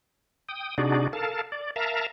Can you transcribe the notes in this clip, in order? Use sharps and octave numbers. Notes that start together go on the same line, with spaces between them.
G5 D#6
C3 D4 D#4 F#4 G#4 D5
A4 A#4 F5 A5
D5
A#4 E5 F5 A5 A#5